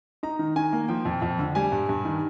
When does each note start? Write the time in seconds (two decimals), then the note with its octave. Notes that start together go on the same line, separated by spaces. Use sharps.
0.23 D#4 A#5
0.39 D#3
0.56 D#3 G#5
0.73 A#3
0.88 F3 G5
1.05 F2
1.22 F2
1.39 D3
1.55 G3 G#5
1.72 G2
1.89 G2
2.05 D#3